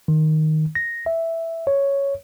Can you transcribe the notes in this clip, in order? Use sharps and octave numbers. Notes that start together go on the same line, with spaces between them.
D#3
A#6
E5
C#5